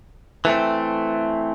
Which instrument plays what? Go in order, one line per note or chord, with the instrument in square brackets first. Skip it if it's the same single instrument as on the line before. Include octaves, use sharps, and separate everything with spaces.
[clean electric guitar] E3 A3 C4